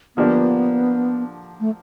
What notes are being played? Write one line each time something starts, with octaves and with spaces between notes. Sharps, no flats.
D3 F3 A#3 B3 D4 G4
A3